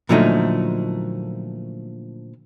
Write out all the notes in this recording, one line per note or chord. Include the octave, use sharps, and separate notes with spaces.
A#2 D3 F3 F#3 A3 D#4